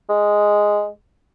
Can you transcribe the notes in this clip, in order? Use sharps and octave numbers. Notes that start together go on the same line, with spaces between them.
G#3